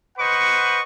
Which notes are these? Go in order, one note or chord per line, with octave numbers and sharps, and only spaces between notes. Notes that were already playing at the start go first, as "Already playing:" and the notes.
B4 C5 D#5 F#5 C#6